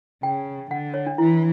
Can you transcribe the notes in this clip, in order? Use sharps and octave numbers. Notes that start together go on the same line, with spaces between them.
C#3 G5
D3 F#5
C#5
D4
E3 E4